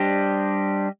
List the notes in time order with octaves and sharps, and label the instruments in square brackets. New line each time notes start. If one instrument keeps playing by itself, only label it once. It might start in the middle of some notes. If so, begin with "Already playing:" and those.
Already playing: [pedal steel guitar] G3 D4 G4 C5 D#5